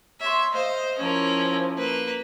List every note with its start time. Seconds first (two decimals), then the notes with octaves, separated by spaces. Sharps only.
0.21 C#5 E5 C6
0.54 C5 D#5 F5
0.99 F3 C#4 E4 A#4
1.77 A#3 B4